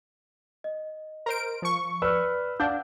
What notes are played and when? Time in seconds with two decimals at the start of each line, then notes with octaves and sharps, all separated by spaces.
0.64 D#5
1.26 A#4 C5 D7
1.62 F3 C#6
2.02 B4 D5 E6 F6
2.60 D4 F5 F#5 G6